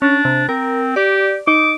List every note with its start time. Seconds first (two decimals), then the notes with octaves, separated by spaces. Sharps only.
0.02 C#4 D4
0.25 C3
0.49 C4 A#4
0.96 G4 D5
1.47 D#4 D6